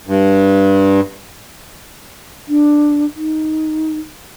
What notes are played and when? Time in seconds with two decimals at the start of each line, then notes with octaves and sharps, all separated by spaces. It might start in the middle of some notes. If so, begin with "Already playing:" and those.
0.07 G2
2.49 D4
3.16 D#4